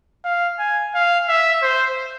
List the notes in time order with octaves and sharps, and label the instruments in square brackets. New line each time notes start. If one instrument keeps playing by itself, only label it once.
[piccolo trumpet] F5
G#5
F5
E5
C5